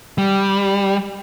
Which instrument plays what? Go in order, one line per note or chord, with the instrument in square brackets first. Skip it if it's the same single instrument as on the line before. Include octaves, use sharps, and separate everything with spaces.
[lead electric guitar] G3